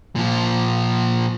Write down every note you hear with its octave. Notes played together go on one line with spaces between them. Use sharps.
A#2 F3